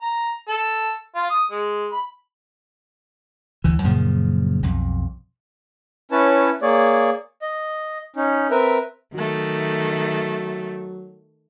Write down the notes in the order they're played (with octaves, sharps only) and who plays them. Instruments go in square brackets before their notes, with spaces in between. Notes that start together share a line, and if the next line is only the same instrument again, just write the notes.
[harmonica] A#5
A4
F4
D#6
G#3
B5
[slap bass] D2 E3
F#2 A#2 C#3 F3
B1 F2
[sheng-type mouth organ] C#4 E4 B4 C#5 A5
A#3 G#4 C#5 D5
D#5
C#4 D#4
C4 A#4 B4 E5
[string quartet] D#3 A3 [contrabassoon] F#3